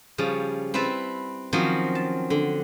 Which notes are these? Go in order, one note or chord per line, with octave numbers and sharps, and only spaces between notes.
C#3 F3 G3 C#4
C4 E4 B4 E5 A5
D#3 F3 F#3 C4 C#4
A5
D3